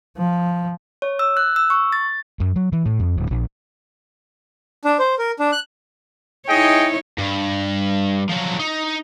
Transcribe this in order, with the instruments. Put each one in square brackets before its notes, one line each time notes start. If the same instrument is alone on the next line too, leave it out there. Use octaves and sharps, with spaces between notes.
[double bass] F3
[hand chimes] C#5
E6
F#6
E6
C#6
A6
[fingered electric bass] F#2
F#3
E3
A2
F2
D1
A#1
[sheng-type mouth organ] D4
C5
A#4
D4
F#6
[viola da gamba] D#4 E4 C#5 [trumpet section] G#4 D#5 G5
[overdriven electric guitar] G2
F3 F#3
D#4